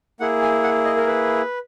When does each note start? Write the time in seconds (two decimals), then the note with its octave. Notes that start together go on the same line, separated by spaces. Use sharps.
0.20 A#3 E4 G#4 F#5
0.42 G#5
0.63 F#5
0.85 D#5
0.97 A#4
1.07 B4